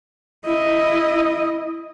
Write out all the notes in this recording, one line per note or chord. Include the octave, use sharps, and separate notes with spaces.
E4 D#5